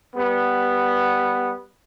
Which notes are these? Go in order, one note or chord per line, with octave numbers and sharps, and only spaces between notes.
G3 B3